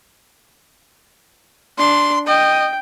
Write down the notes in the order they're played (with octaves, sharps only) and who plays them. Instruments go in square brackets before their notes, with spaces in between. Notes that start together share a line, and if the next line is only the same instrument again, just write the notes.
[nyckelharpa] D4 [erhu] C6
[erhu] D#5 [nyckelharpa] G5